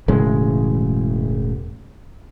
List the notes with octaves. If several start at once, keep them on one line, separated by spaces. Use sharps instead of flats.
E1 A2 C#3 G#3